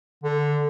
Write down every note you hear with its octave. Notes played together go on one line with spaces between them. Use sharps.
D3